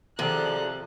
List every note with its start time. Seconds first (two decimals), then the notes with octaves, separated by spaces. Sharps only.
0.19 C3 D#3 F3 G#4 A4 D5 A#5 F#6